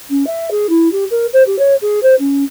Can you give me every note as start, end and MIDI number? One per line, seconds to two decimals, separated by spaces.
0.09 0.25 61
0.26 0.50 76
0.50 0.66 68
0.69 0.90 64
0.91 1.04 67
1.10 1.26 70
1.32 1.42 72
1.46 1.58 67
1.58 1.74 73
1.81 1.99 68
2.02 2.14 72
2.18 2.43 61